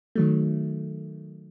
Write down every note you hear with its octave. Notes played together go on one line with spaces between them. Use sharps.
D#3 F#3 A3